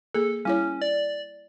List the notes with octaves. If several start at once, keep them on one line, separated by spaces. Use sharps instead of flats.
A#3 G#4 A4
G3 C#4 E4 C#5
D5